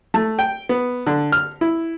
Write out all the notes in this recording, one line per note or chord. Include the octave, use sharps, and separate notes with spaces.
A3
G5
B3
D3
F6
E4